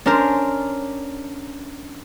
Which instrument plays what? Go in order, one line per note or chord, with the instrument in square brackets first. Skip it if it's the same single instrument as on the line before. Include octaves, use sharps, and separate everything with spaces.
[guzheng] C#4 C5 [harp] D4 A#4